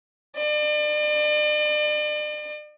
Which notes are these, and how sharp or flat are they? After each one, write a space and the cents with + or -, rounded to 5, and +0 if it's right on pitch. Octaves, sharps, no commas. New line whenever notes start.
D5 +40